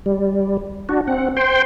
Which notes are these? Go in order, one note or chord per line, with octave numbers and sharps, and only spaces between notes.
G3
D4 F#4
C4 F#5
C5 G5 C6